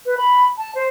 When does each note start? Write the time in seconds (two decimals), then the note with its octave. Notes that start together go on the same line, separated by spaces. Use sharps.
0.06 B4
0.17 B5
0.58 A5
0.75 C5